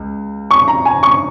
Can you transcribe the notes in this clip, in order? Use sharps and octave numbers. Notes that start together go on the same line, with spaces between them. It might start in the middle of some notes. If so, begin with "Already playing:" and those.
Already playing: C#2
C#6
A#5
G#5
C#6